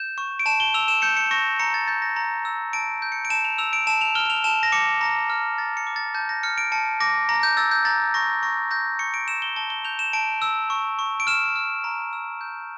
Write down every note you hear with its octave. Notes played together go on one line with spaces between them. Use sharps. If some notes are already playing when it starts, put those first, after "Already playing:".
Already playing: G6 E7
C#6
D7
A5 E7
G7
E6 F7
E7
G6 C#7
C#7
C#6 A#6
A#5 C#7
A6
G6 A6
A#6
A#5
E6
A5 D7
G6
C#7
D7
A5 E7
F7
E6 F7
D7
A5 E7
F7
F6 G7
F7
A5 E7
A#6
D6 C#7
A#5 A#6
F6
A#5 A6
C#7
D6
A6
A5 G6
A#6
F6 C#7
D7
A5 C#7
D6 A#6
A#5 A#6
G6
E6 A6
G6
A#5 A6
C#6 A#6
C#6 A#6
G6 A#6
C#6 C#7
D7
E6 E7
G7
A5 G7
G7
G6 F7
E7
A5 D7
E6
C#6
C#6
D7
F6 E7
F6
A#5
E6
G6